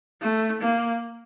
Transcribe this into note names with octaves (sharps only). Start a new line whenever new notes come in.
A3
A#3